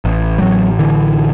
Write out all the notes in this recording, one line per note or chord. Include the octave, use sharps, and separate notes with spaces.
A1
G3
A1 F#3
D3 E3